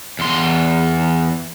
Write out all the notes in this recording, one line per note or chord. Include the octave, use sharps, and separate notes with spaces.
E2 C6